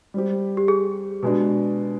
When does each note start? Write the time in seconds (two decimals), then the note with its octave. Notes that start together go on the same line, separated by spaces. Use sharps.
0.14 G3 C4 G4
0.57 G4
0.68 G#4
1.23 B2 G#3 D4